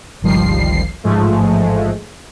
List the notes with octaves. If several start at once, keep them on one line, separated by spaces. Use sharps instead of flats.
G1 C#2 D#3 F3 G3 C7
A1 G#2 F3 G#3 A3